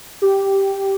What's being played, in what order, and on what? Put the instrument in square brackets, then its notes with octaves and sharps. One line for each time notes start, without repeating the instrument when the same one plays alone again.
[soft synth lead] G4